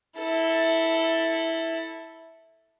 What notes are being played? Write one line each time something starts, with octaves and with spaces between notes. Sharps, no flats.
E4 A4